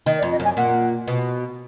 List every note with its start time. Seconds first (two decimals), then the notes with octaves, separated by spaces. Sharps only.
0.06 D#3 D#5
0.18 D5
0.22 F2
0.31 D#5
0.40 F#2 G#5
0.57 A#2 F#5
1.08 B2